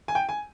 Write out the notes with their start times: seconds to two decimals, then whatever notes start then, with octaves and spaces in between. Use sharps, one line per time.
0.08 G#5
0.15 G5
0.29 G#5